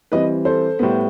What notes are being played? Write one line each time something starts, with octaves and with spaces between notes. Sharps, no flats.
E3 G3 C4 B4 D#5
A4 C5
A2 G3 B3